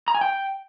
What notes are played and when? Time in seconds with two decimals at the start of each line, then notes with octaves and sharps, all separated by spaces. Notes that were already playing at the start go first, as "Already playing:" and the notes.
0.08 A#5
0.15 G#5
0.21 G5